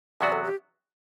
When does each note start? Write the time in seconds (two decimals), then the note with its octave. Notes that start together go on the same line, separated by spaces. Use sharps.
0.21 E2 C3 F#3 B3 F#4 D5
0.32 A4
0.44 G4